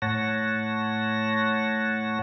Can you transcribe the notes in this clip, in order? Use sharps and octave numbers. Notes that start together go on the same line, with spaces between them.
A2 C#5 F#5 A5 A#6